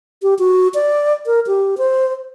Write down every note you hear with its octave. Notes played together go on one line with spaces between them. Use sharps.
G4
F#4
D5
A#4
G4
C5